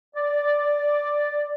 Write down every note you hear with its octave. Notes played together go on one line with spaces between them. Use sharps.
D5